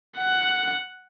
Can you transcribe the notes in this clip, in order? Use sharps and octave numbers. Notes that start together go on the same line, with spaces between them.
F#5